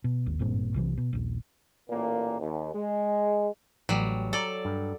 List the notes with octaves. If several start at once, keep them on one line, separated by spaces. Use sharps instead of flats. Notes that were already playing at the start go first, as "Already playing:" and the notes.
B2
G#1 D#2
G#1 G2 A#2 C4
B1 C3 D#3 E3
B2
D#1 A#1
A1 A#2 A#3
D#2
G#3
A1 F#3 G3
A4 C#5 D5 A#5
G2